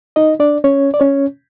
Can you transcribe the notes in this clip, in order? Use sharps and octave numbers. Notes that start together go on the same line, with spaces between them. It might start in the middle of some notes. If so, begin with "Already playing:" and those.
D#4 D#5
D4 D5
C#4 C#5
D5
C#4 C#5